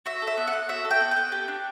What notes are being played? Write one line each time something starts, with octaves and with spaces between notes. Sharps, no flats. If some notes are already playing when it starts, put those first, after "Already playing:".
F#4 E5
A4
E5
B3
F#5
B3
F#4 E5
A4
G5
B3
G5
B3
G4
D4